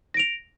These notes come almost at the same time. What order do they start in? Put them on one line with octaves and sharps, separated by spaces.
A#6 D7 F7